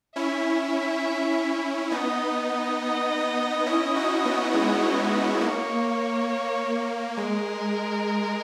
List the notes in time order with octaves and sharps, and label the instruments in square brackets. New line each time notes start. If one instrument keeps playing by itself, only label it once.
[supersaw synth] C#4 E4 [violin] E5
[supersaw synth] B3 D#4 [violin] D#5
[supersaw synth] C#4 E4
D#4 F#4
B3 D#4
G#3 B3
[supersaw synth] A#3 [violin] C#5
[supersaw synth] G#3 [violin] A#4